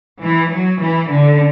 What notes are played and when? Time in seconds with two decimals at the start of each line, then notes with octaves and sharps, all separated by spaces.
0.23 E3
0.52 F#3
0.82 E3
1.11 D3